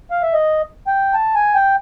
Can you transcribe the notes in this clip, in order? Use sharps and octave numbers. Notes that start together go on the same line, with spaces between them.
F5
E5
D#5
G5
A5
G#5
G5